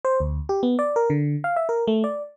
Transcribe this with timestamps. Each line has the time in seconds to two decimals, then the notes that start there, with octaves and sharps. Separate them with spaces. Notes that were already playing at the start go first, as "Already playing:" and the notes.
0.05 C5
0.20 D2
0.49 G4
0.63 B3
0.79 D5
0.96 A#4
1.10 D3
1.44 F5
1.56 E5
1.69 A#4
1.87 A3
2.04 D5